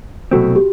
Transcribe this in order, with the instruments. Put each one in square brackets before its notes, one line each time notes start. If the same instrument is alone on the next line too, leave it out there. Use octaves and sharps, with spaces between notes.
[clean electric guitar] C2 B2 F#3 A3 C4 [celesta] F#4
[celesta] G4